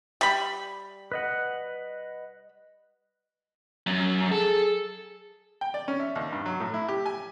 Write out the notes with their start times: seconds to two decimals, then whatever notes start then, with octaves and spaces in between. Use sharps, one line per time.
0.21 G3 B5
1.12 B4 D#5 F#5
3.87 F#2
4.32 G#4 A4
5.61 G5
5.74 D5
5.88 C#4
6.00 E5
6.15 D#2
6.32 G2
6.46 F#3
6.60 A2
6.74 E4
6.88 G4
7.06 G#5